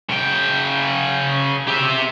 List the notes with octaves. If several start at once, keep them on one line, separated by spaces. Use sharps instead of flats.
C#3 G5
G4 E5